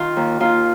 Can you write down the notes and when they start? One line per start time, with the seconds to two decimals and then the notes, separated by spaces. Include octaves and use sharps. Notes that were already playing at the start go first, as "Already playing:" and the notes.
Already playing: D#3 F4
0.17 D#2
0.40 D#2 F4